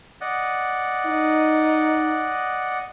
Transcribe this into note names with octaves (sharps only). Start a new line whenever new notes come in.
D5 D#5 F#5
D#4